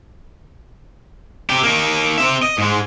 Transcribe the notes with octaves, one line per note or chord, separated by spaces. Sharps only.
C3 G4
A#3 D#4
C4 E5
D#5
G#2 G#3